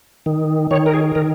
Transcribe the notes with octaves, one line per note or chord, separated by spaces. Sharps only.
D#3
D#3 C#5
A#4
G#4
D#3 A#4